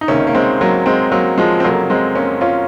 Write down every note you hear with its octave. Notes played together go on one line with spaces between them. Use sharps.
D#4
C#2 C3 D#3 A#3 C#4
A#3
G#3 C4
F#3 A#3
G#3 C4
F#3 A#3
F3 G#3
C4
F1 F2 C#3 F#3 A#3
G#3 C4
A#3 C#4
C#4 F4